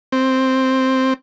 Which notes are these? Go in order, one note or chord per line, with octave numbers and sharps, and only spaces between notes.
C4